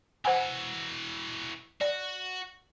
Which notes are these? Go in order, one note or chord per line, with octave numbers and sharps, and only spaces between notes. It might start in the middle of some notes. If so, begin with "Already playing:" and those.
E3 F#4 C5 F#5 G#5
F#4 D5